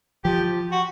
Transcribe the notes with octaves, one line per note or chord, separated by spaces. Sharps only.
F3 G4
F#4